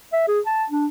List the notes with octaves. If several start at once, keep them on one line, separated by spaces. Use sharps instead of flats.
E5
G#4
A5
D4